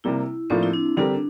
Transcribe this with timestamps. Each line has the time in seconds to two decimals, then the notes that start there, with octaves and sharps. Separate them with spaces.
0.04 C3 G3 A#3 E4
0.50 A2 F3 A#3 C4 D4 F4
0.63 E4
0.73 D4
0.97 D3 G3 C4 D4 G4 A#4